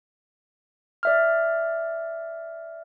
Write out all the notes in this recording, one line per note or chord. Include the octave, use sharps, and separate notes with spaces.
D5 E5 F6